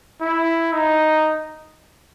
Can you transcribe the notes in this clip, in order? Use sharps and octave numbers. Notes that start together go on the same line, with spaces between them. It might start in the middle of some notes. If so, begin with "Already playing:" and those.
E4
D#4